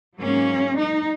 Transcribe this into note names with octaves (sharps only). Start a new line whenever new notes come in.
G#2 F#3 A#3 C#4
D#4